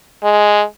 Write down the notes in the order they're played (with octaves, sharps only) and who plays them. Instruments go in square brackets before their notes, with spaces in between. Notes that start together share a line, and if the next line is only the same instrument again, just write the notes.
[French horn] G#3